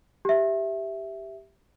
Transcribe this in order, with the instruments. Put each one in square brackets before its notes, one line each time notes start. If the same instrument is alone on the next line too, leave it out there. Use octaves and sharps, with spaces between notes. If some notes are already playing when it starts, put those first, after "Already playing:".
[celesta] G4 E5